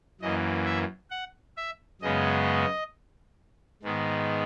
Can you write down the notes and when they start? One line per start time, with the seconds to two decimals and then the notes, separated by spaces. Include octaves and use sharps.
0.21 F#2 E3 A#3 D#5
0.65 E5
1.11 F#5
1.57 E5
2.01 F#2 C#3 G#3 B3 D#5
3.83 G#2 D#3 G#3 B3